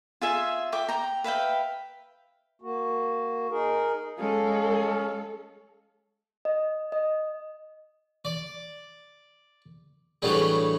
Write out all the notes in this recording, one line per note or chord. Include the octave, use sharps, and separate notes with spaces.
F4 G#4 E5 G#5
E5 G5 D6
G5 A#5
B4 E5 F5 G5
A#3 F#4
D#4 G#4 A#4
G#3 C#4 A4 F5
D#5
D#5
D5
A2 E3 F#3 G3 D4 G#4